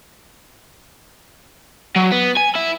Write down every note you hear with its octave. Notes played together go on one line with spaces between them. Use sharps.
F#3
B3
G#5
E4